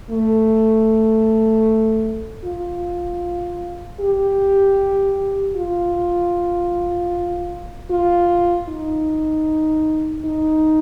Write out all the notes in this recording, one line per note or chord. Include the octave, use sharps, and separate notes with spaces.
A3
F4
G4
F4
F4
D#4
D#4